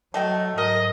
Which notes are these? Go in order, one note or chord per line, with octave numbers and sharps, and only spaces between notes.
F#3 A3 D#5 G5
G#2 A#4 D#5